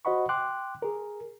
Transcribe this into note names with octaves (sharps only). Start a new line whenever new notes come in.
F#4 C5 D#5 F#5 B5 C#6
G5 C6 D6 F#6
G#4 A#4